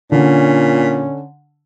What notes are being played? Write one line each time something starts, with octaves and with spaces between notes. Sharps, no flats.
A#2 D3 C#4